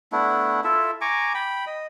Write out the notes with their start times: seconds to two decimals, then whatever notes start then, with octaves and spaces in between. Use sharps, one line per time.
0.12 A3 B3 D4 E4
0.64 E4 F4 A4 E5
1.01 G#5 A#5 C#6 D6
1.35 G5 B5
1.67 D#5